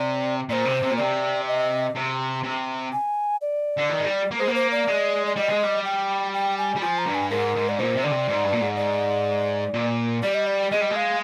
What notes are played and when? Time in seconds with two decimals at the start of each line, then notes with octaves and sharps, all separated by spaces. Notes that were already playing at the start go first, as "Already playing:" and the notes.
Already playing: C3 D5
0.49 A#2 D5
0.53 C5
0.65 C3
0.82 C3
0.91 A#2
0.98 C3 D5
1.47 D#5
1.96 C3
2.43 C3
2.93 G#5
3.42 D5
3.78 D3
3.90 D#3
4.00 G#3
4.06 G3
4.31 A#3
4.39 G#3 C5
4.47 A#3
4.55 C5
4.71 D5
4.87 G#3
5.27 D5
5.36 G3 D#5
5.49 G#3
5.63 G3
5.85 G5
6.33 G5
6.58 G#5
6.76 G3
6.82 F3 G#5
6.98 A#5
7.06 G2
7.15 G#5
7.31 G#2 A#4
7.56 G#2
7.69 D5
7.79 A#2 C5
7.95 C3
8.03 D3 D5
8.11 C3
8.28 G#2
8.44 G2
8.53 A#2
8.61 G#2
8.77 D5
9.74 A#2
10.23 G3 D5
10.35 D#5
10.47 D5
10.71 G#3 D#5
10.81 G3
10.91 G#3 F5